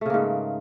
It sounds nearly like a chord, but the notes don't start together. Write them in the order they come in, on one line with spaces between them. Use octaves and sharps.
A3 C#3 A#3 G#2